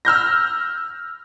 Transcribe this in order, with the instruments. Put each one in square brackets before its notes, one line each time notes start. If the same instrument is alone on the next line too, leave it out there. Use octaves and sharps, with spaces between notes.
[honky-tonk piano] E6 F6 G6 A#6